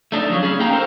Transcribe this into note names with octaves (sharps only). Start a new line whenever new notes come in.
A3 D4 D#4
F3 F#3 C#4
C#4 G#4
A#3 D#4 G#4 F5 G5 A#5
A4 A#4 C5